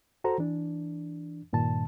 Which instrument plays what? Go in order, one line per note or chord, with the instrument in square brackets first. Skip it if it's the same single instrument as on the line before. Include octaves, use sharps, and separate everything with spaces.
[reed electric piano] F#4 A4 C5 A#5
E3 D4
G2 A#2 D#3 A5